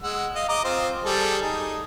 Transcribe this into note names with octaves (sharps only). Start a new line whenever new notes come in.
G#3 F#5 E6
D#5 F5
D#5 A#5 D6
C4 F4 C5
G3 G#4 A4
D#4 G#4